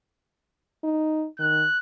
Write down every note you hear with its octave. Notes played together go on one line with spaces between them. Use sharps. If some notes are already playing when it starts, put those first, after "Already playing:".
D#4
D#3 F#6